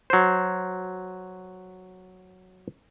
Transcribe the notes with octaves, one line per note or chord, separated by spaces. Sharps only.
F#3 C5